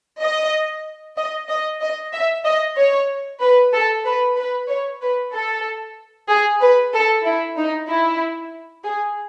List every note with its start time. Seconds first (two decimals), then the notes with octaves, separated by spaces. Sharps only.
0.21 D#5
1.17 D#5
1.49 D#5
1.82 D#5
2.14 E5
2.45 D#5
2.77 C#5
3.41 B4
3.73 A4
4.06 B4
4.38 B4
4.69 C#5
5.02 B4
5.33 A4
6.29 G#4
6.61 B4
6.93 A4
7.25 E4
7.58 D#4
7.89 E4
8.85 G#4